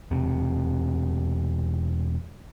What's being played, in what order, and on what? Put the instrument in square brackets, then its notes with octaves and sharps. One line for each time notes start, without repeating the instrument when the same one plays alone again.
[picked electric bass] E1 C3